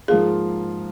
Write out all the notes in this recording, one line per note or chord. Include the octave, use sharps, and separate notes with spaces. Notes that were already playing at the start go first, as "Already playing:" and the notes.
G#2 F3 A#3 F4 G#4